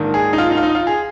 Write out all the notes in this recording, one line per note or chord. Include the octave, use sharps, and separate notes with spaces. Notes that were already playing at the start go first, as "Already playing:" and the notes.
Already playing: A#1 G#2 D#3 A#3
G#4
D#4
F4
D#4
F4
D#4
F4
G#4